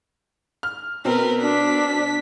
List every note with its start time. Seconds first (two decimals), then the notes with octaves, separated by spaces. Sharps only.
0.63 F6
1.05 B2 C4 A#4 B4
1.41 D4 B6